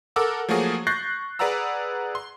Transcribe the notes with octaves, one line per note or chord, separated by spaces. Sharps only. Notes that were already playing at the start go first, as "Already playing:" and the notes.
A4 A#4 F#5 D6 E6
F3 F#3 A3 A#3 F#4 G#4
C#6 F#6 G6 A6 A#6 C7
G#4 B4 D5 F#5 A#5 E6
C6